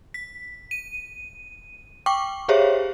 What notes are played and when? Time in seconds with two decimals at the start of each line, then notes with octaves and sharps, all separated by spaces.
0.14 B6
0.71 D#7
2.06 G5 C#6 D6
2.48 G4 G#4 C5 C#5 E5 F5